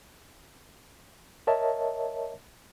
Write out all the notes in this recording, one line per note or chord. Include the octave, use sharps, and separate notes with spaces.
A#4 C#5 D#5 E5 A5